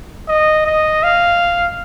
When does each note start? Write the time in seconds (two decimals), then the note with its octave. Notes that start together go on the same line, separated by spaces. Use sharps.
0.28 D#5
0.66 D#5
1.03 F5